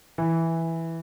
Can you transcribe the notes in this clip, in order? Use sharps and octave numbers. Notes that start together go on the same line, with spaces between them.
E3